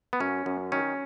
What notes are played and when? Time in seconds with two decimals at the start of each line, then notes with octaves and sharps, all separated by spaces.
0.13 B3
0.20 F#2 C#4
0.46 F#2
0.72 D#3 C#4